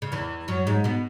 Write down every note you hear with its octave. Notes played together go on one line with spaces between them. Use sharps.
C#3
E2 E3
F#2 F#3
G#2 G#3
B2 B3